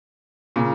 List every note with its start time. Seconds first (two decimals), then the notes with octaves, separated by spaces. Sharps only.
0.56 A#2 C#3